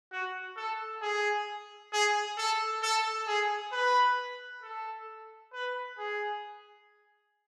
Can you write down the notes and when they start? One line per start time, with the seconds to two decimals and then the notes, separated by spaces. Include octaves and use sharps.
0.12 F#4
0.57 A4
1.02 G#4
1.92 G#4
2.38 A4
2.83 A4
3.27 G#4
3.72 B4
4.63 A4
5.53 B4
5.98 G#4